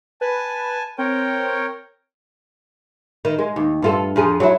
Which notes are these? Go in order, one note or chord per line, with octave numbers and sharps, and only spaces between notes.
B4 G#5 A5
C4 A#4 C#5 G5
D#3
G#3
D#2
G2 F4 A4
F2 F3 G#4
F#3 E4